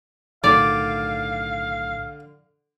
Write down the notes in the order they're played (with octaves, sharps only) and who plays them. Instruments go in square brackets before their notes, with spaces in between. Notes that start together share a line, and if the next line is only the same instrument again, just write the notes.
[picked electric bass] B1 A2 D#3 [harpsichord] D3 [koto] D5 [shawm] F5